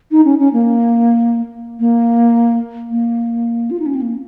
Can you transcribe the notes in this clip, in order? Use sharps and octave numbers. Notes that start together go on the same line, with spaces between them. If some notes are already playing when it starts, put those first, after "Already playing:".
D#4
C#4
C#4
A#3
A#3
A#3
F4
D#4
C#4
C4
A#3